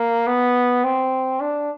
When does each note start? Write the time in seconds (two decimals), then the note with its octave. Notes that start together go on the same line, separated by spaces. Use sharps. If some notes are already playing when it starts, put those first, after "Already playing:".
Already playing: A#3
0.27 B3
0.84 C4
1.40 D4